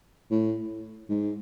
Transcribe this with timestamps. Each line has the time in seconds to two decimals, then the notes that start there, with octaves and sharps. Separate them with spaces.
0.30 A2
1.09 G#2